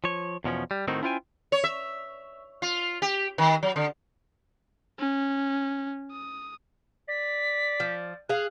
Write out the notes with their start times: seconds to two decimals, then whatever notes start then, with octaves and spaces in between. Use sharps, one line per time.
0.04 F3 C#5
0.44 E2 B2 F3 C#4
0.71 G3
0.88 A2 D#3 C4 D#4 F#4
1.03 C#4 E4 F4 C5 G5 G#5
1.52 C#5
1.64 E5
2.62 F4
3.02 G4
3.38 D#3
3.63 F#3
3.76 D3
4.99 C#4
6.11 D#6
7.08 D5 B6
7.80 F3
8.29 G#4 F5 F#6